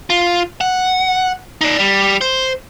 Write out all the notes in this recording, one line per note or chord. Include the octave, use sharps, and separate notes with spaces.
F4
F#5
D#4 D5
G3
C5